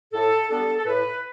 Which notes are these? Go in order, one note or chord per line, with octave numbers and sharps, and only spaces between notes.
A2 A4
G3 B3 D4 A4
A4
A2 B4